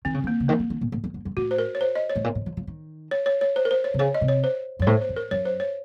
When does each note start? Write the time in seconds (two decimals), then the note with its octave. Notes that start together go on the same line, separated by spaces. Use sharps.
0.05 D#3 C4
0.14 C#3
0.24 D#3
0.27 A#3
0.40 C#3
0.48 D#3 A#3
0.59 F3
0.70 D#3
0.81 A#2
0.92 A2
1.04 F2
1.14 F#2
1.25 F#2
1.37 A2 F#4
1.51 C5
1.58 A#4
1.75 C#5
1.81 C5
1.95 D#5
2.10 C#5
2.16 A2
2.24 A#2
2.35 A2
2.46 F3
2.57 F3
2.67 D#3
3.11 C#5
3.26 C#5
3.41 C#5
3.56 C5
3.65 A#4
3.71 C5
3.84 C#5
3.94 C3
3.99 C#3 C#5
4.14 D#5
4.21 C3
4.28 C#5
4.44 C5
4.79 F#2
4.82 C#5
4.87 A2 C5
5.01 C5
5.09 F2
5.16 A#4
5.31 F#2 C#5
5.45 C5
5.60 C#5